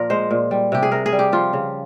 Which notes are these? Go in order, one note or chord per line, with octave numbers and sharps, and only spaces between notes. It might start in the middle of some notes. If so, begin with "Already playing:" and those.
Already playing: A#2 F3 A#4
G#3 C5
A#2
G3
C3 G4
G#4
C3 A#4
G#4
G3
G4
F3 F4
C#3